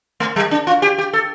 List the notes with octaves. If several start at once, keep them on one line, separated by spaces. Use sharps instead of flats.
A3
G3
D4
F4
G4
G4
A4